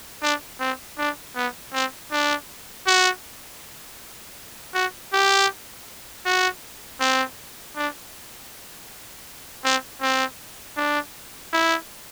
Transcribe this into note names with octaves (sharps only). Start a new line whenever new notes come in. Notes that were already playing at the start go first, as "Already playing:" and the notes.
D4
C4
D4
B3
C4
D4
F#4
F#4
G4
F#4
C4
D4
C4
C4
D4
E4